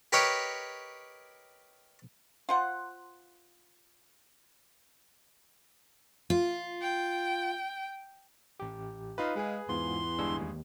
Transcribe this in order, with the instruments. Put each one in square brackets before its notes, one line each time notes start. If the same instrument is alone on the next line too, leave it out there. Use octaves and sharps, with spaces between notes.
[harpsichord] G4 A#4 B4 C#5 D#5 G5
[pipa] F4 C5 F#5
[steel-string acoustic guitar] F4
[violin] G5
[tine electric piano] A1 G4
[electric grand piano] D#4 F4 B4 [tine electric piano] D#5 F5 D#6
[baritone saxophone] G#3 [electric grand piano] G#4 B4
[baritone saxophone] E2 [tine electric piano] G#2 B3 F4 [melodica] C6
[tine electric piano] G1 D4 E6 [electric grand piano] G2 G#3 G#4
[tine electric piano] D#2